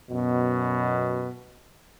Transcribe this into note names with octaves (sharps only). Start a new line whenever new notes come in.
F#2 B2